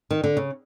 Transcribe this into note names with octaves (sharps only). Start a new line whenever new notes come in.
D#3
D3
C#3